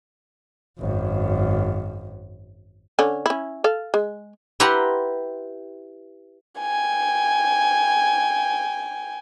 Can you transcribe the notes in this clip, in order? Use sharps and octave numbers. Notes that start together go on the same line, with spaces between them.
G#1 F#2
D3 C#4
C#4 E4
A4 F5
G#3
E4 G4 B4 F#5 A#5 C6
G5 G#5